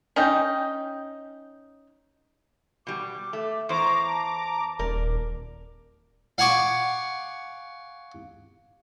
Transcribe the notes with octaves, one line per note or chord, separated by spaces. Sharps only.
C#4 D#4 G5
B2 G3 D6
A3
E2 C5 A#5 C#6 D6
A5
D#1 A#4 D5
F5 F#5 G#5 C#6 D6